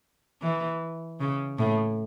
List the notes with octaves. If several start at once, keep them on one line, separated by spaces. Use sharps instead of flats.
E3
C#3
A2